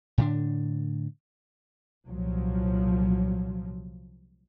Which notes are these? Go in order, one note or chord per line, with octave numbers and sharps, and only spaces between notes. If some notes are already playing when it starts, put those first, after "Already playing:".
A2 D3 D4
C2 A#2 F3 F#3